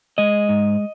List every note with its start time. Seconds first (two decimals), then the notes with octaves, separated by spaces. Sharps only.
0.18 G#3 D#5
0.49 G#2